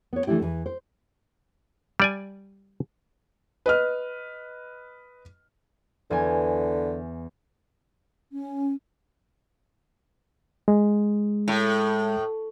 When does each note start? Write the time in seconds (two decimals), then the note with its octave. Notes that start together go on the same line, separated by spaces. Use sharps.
0.13 B3 C#5
0.27 C#3 E3 A3 D4 E4 G4
0.40 E2 A2 E3
0.66 C5
2.00 G3 D5 G#5
3.66 B4 D#5 F6
6.11 E2 D3 G#5
8.32 C#4
10.68 G#3
11.48 A2